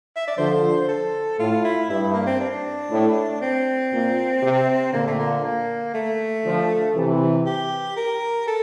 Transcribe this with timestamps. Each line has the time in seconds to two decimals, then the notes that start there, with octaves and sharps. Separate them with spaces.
0.16 E5
0.27 D5
0.38 D3 F3 C5
0.88 A4
1.39 A2 F4
1.65 E4
1.90 G2 E4
2.13 A#3
2.27 C4
2.41 D4
2.91 A2
3.41 C4
3.93 A#2
4.43 C3
4.93 A#2 D3 A#3
5.07 A3
5.19 A#3
5.44 A#3
5.94 A3
6.45 D3 F3
6.96 C3 E3
7.46 G4
7.97 A#4
8.48 A4